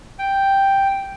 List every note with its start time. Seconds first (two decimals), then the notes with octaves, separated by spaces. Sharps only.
0.19 G5